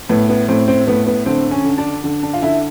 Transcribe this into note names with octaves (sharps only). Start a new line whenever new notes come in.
A2 B3
B3
A2 C4
C4
A2 B3
B3
D3 C4
C#4
D3
D4
D3
D4
F4
D3 E4